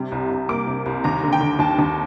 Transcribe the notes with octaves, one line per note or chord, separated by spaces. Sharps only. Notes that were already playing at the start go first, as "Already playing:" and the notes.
Already playing: C3 G3
C2
C2
A#3 D6
C3
C2
D#2 A#5
D3
G5
D3
D#2 A5
D#2